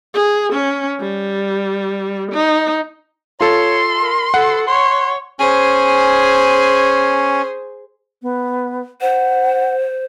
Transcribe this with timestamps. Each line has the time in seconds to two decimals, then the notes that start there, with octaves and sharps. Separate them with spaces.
0.14 G#4
0.53 C#4
1.00 G3
2.32 D#4
3.41 F4 A4 C#5 C6
4.02 A#4
4.34 A4 F#5
4.67 C#5 C6
5.40 C#4 G#4 C5 G#5
8.22 B3
9.01 C5 F#5